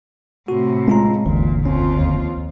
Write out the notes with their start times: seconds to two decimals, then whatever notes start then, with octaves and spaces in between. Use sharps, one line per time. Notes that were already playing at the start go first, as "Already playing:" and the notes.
0.48 A2 C3 F#4
0.88 G#3 C#4 F4 A#5
1.26 F#1 D2 A#2 E3
1.66 F2 C#4 F4
1.98 D#2